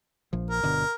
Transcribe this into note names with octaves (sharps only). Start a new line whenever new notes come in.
A#1 F3
A#4
G1 B2 D3